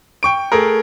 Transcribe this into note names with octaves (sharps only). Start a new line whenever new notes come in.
G5 C#6 D7
A3 G#4 A#4